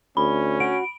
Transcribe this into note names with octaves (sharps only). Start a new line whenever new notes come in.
D2 C#4 B5
F#4 D7